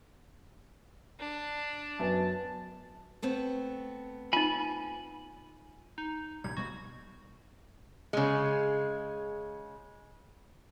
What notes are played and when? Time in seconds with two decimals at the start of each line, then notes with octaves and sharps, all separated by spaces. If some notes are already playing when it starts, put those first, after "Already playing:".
1.20 D4
2.00 F#2 F#3 B3 A5
3.22 A3 B3 C4
4.33 D#4 F4 G#5 B5
5.98 D#4
6.44 A#1 C3 G3 G#6
6.57 B2 G3 G#3 F#4
8.13 C#3 G#3